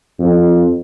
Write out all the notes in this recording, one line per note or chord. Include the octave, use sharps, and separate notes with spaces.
F2